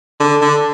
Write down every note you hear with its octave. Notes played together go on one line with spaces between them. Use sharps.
D3
D3